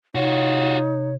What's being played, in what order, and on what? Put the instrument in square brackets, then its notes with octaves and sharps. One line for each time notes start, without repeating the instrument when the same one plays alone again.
[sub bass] C3 [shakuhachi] D#4 [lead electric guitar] F4 F#4 [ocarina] C#5